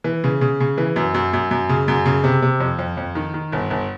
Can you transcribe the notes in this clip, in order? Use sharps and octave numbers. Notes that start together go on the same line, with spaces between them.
E3
C#3
C#3
C#3
E3
F#2
F#2
F#2
F#2
C#3
F#2
C#3
C3
C3
F2
F2
F2
D#3
D#3
G1
G1